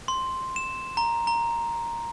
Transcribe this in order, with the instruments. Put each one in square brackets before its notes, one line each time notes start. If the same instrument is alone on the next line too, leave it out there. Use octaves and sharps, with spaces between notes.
[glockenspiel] C6
E7
A#5
A#5